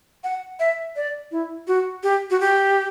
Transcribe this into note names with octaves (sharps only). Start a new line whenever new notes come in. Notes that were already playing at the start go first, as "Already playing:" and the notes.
F#5
E5
D5
E4
F#4
G4
F#4
G4